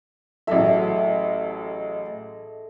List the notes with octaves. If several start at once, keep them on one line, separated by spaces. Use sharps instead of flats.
A1 F#3 A3 G#4 D#5 E5